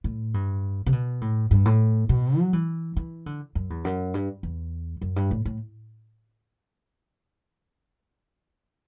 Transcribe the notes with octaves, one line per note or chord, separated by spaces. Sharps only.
A2
G2
C3
B2
A2
G2
A2
B2
F#3
E3
E3
D3
F#2
E2
F#2
G2
E2
F#2
G2
A2
A2